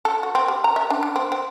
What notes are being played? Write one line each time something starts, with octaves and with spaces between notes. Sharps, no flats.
A4
F#4
C4
G3
A#5
E5
D4
D4
C4
C4